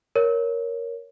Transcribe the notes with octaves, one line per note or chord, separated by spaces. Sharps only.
A#4 C#5